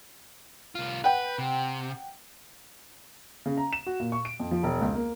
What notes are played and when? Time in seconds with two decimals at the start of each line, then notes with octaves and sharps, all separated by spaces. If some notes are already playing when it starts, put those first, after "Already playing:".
0.75 C2 F4
1.04 B4 F#5 G5
1.38 C3
3.46 C#3
3.57 A#5
3.73 E7
3.86 F#4
4.00 A#2
4.12 C#6
4.25 D7
4.40 F2
4.51 F3
4.63 E1
4.81 C#2
4.94 A#3